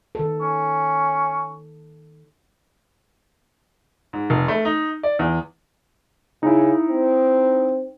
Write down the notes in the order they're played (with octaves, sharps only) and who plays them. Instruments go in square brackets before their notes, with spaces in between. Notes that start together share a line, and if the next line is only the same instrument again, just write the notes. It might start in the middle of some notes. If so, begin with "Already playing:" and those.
[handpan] D#3 A4
[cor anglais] C#4
[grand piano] G#2
F1
A3
D#4
D5
E2
[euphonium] C#3 [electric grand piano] D#4 E4
[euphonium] C4